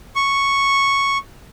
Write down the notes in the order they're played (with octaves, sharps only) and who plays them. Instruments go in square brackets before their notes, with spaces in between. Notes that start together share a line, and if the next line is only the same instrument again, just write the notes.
[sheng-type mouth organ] C#6